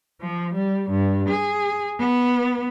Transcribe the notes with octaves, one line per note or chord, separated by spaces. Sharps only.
F3
G3
G2
G#4
B3